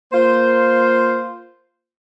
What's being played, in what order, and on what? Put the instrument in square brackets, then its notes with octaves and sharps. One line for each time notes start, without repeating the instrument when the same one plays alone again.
[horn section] A#3 F4 C5